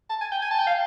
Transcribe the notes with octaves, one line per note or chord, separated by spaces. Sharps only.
A5
G#5
G5
G#5
A5
G5
F5